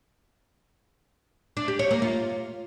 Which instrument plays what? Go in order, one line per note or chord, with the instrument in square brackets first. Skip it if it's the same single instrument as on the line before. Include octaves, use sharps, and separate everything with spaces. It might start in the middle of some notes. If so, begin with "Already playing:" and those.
[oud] D4
G4
C#5
A#3
F4